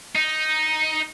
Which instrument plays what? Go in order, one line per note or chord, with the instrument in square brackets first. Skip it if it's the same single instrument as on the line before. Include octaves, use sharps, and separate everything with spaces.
[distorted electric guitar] D#4